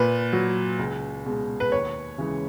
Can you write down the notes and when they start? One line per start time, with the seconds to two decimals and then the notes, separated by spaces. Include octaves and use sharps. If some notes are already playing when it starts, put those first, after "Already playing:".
Already playing: A#2 B4
0.33 F#3
0.79 C#2
1.26 B2 G#3
1.60 B4
1.72 D#2 C#5
2.18 C#3 E3 G#3